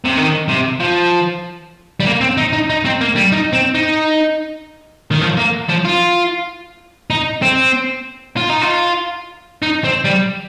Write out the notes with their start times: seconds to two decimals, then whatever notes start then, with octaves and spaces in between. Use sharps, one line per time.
0.05 C3
0.17 D#3
0.48 C3
0.80 F3
2.00 G3
2.06 A#3
2.21 C4
2.37 D#4
2.53 D#4
2.70 D#4
2.85 C4
3.01 A#3
3.16 G3
3.32 D#4
3.53 C4
3.75 D#4
5.11 D#3
5.21 F3
5.37 A#3
5.69 F3
5.85 F4
7.10 D#4
7.42 C4
8.37 F4
8.50 D#4
8.62 F4
9.63 D#4
9.84 C4
10.05 G3